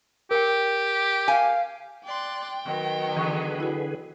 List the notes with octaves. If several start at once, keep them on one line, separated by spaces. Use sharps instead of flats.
G4 A#4 G5
F5 G#5
D5 G5 C6 F#6
D#3 F#3 B3
D3 E3 G#4 B4 C#6 F#6
E4 F#4